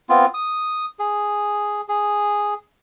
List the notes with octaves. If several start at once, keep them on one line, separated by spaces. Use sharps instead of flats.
B3 C4 F4
D#6
G#4
G#4